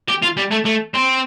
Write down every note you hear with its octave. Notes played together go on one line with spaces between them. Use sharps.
G4
F4
G3
A3
A3
C4